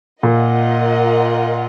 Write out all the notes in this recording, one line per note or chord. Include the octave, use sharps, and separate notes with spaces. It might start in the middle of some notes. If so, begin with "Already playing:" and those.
A#2 F4 A#4 D#5 F#5